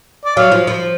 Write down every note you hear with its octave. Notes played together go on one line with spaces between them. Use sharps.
D5
F#3 F5
F3
F3